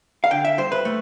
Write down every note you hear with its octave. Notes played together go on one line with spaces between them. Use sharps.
F5
D3 G5
E5
G2 C5
B4
A3